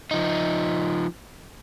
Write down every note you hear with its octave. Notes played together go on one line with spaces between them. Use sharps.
F3 D#4